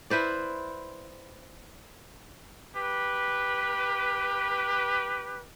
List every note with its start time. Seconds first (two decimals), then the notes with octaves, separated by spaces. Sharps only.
0.10 E4 B4 C5 D5
2.75 G4 B4